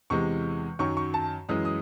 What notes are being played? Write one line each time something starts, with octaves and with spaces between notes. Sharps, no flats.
E2 C3 E3 G#3 C#6
F#2 D#3 F#3 C#6
C#6
A5
F#2 E3 G#3 D#6
D#6